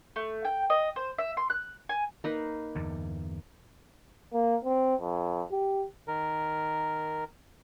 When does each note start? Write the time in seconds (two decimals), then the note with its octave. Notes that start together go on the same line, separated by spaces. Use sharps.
0.16 A3
0.45 G5
0.70 D#5
0.96 C5
1.18 E5
1.37 C6
1.50 F#6
1.89 G#5
2.24 A#3 D#4 B4
2.75 E2 G2 D3
4.33 A#3
4.65 C4
5.01 F2
5.51 G4
6.08 D#3 A#4